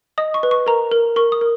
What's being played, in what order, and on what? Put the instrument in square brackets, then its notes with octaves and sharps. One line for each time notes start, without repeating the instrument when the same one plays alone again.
[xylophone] D#5 D#6
C#6
B4
C#6
A#4 A#5
A#4
A#4 C#6
D#6
A#4